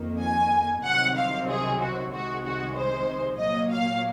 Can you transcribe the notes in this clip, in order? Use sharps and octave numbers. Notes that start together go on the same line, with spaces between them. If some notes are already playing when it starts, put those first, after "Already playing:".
Already playing: F2 D#3 A#3
G#5
C2 C3 D#3 F#3 C4 F#5
F5
G#4
F#4
C2 C3 D#3 G#3 F#4
F#4
C5
A#2 F#3 A#3 D#5
F5